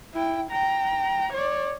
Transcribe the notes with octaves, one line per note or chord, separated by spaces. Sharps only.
E4 G5
G5 A#5
C#5 D5